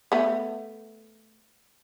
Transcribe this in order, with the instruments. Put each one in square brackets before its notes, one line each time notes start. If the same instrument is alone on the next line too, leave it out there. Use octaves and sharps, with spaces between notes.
[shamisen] A3 B3